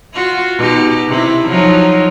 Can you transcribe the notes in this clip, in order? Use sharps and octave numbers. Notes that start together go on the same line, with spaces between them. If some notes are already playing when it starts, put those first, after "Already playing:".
F4 F#4
B2 D#4 G4
C3 E4
F3 F#3 D#4